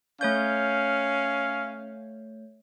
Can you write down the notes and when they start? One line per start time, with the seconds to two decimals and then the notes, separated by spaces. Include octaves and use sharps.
0.21 A3 C#4 C#5 F5 G6